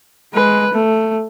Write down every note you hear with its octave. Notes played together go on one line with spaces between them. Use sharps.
G#3 B4
A3